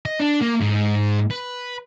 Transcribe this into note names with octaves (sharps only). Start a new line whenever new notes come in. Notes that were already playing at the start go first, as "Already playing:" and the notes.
D#5
D4
A#3
G#2
B4